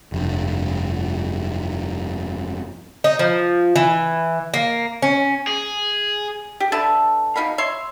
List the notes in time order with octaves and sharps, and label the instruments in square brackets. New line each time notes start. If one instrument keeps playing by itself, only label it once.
[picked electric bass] F1 G2
[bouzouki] D#4
F3
E3
A#3
C#4
[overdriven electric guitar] G#4
[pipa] G4
D3 B4 E5 A5
B2 D#4 F5 B5
C#5 E5 C6